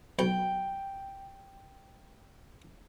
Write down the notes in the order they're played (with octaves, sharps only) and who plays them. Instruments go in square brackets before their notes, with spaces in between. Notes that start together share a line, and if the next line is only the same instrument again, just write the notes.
[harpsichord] B1 [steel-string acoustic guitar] G5